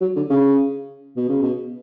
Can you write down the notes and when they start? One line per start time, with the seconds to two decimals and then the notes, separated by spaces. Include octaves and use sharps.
0.01 F#3
0.16 D3
0.30 C#3
1.16 B2
1.29 C#3
1.42 B2